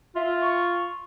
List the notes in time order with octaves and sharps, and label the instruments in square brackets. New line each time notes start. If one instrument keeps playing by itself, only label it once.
[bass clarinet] F4 [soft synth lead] E5
[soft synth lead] C#6